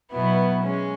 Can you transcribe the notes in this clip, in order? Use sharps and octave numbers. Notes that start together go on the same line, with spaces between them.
B2 F#3 B3 E4
G#3 C#4